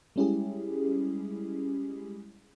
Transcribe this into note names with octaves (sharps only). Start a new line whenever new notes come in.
G3 G#3 C#4 E4 G4 G#4